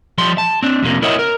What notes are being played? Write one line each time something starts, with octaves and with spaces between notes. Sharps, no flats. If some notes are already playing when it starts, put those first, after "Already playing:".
F3 G3 C6
A5
C4 D4
F2 C3 A#3
E4 A#4 C#5 D#5 E5 F#5
A#4